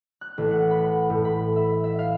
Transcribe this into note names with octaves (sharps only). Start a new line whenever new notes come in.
F#6
A1
F#5
B5
F#5
A2
B5
E5
E5
F5